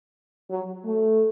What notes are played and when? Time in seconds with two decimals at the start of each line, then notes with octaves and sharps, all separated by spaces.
0.50 F#3
0.84 A3